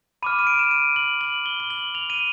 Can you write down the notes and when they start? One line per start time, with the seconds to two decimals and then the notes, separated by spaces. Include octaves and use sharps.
0.23 B5 D6 F6 D#7
0.39 D#7
0.47 D7
0.59 E7
0.71 D#7
0.96 F#7
1.21 F#7
1.46 G7
1.60 G7
1.70 F#7
1.95 F7
2.10 D#7